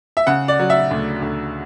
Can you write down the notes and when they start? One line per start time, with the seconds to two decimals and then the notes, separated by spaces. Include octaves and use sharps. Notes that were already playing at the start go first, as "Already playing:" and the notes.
0.17 E5
0.27 C#3 F#5
0.48 D5
0.59 F#3
0.70 E5
0.91 D2
1.22 D2